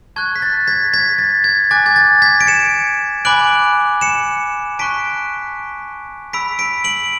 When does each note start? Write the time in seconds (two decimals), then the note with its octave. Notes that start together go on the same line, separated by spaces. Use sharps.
0.16 A5 C#6 F#6 G#6
0.36 B6
0.42 A6
0.68 G#6 B6
0.94 G#6 B6
1.19 A6
1.44 G#6
1.71 G#5 D6 F#6 A6
1.86 G#6
1.96 A6
2.22 G#6 B6
2.41 D7
2.47 C#7 E7
3.25 G#5 B5 D6 F#6 D7 F#7
4.01 C#7 E7
4.79 A5 C#6 F#6 B6 D7
6.33 B5 E6 B6 D7
6.59 B6 D7
6.84 D7 F#7